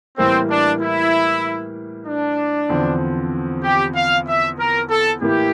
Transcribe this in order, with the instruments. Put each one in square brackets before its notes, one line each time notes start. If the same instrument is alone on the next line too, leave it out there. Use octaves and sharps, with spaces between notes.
[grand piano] A2 E3 G3 A#3 [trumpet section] C4
[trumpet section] D4
E4
D4
[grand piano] E2 D3 F3 C4
[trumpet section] G4
F5
E5
A#4
A4
[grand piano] A2 E3 A#3 E4 [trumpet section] G4